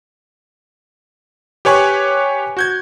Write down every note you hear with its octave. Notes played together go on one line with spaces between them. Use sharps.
G4 B4 C#5 G#5 C#6 F#6
F#4 G6 G#6